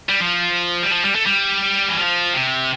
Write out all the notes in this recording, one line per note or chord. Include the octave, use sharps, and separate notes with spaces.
G3
F3
G3
F3
G3
A3
G3
E3
F3
C3